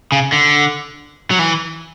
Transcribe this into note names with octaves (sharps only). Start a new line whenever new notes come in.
C#3
D3
F#3
E3